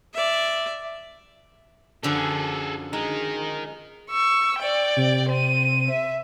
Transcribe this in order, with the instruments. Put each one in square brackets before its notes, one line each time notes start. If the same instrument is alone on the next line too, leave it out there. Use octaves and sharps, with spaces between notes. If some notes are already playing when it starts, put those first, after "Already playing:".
[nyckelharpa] D5 E5
[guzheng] F#2 D3 F3 [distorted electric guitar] G#4 A4
[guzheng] G#3 [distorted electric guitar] D#4 A#4
[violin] C#6 E6
D5 G5
[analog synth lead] C3
[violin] C4 D#7
E5